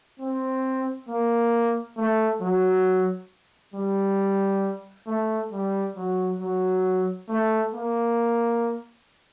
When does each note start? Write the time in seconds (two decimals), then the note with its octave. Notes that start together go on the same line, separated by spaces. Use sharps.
0.20 C4
1.08 A#3
1.97 A3
2.41 F#3
3.74 G3
5.07 A3
5.52 G3
5.96 F#3
6.40 F#3
7.29 A3
7.74 A#3